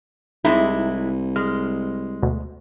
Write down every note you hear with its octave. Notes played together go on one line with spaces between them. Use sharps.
C2 C3 G#3 D#4 E4
G#3 F6
D2 B2